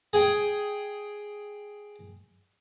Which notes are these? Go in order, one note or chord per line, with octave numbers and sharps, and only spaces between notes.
G#4 G5